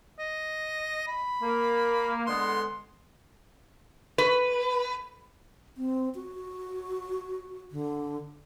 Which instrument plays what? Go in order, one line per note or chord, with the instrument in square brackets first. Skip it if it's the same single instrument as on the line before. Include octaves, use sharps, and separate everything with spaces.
[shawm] D#5
B5
[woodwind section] A#3
[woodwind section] D3 G#3 B3 [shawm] C6
[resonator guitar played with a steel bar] B4
[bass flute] C4
F#4
D3